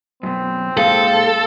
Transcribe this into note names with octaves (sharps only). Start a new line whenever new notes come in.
F#2 B2 C4
A#2 G#3 A4 F5